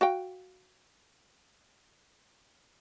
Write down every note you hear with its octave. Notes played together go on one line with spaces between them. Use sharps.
F#4 F5 G5